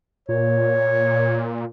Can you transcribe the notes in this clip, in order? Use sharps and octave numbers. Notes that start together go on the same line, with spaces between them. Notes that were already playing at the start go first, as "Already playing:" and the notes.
A#2 C#5